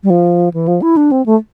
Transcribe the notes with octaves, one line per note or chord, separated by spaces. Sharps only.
G3
F3
E3
F3
E4
D4
C4
A3